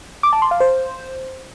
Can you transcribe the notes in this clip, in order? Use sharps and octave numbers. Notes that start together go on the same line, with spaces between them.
D6
A5
C6
F5
C5